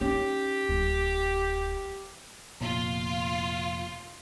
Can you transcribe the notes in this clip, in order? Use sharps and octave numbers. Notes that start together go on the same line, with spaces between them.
C#4 D#4 G4
D1
F1 A#2 B3 F4